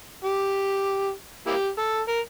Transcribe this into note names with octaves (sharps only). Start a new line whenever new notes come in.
G4
A#3 E4 G4
A4
A#4